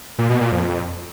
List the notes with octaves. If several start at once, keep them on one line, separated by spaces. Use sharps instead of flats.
A#2
B2
A#2
F2